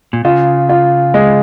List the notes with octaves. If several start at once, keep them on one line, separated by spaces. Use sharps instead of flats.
A#2
C#3 F4
F4
G#3